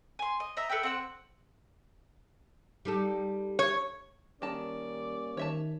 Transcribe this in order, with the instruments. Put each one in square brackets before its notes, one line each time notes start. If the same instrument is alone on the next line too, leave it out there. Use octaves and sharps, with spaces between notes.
[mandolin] G#5 C6
D#5
D#5 E5 A#5
A4 B4 E5 G5
C4 F#5 E6
[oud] G3 D#4 A4
[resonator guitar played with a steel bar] C#5
[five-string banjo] D#3 A5 [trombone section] G3 A#3 C#4 [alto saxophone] D5
[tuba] D#3 [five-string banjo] C#5 E5 A5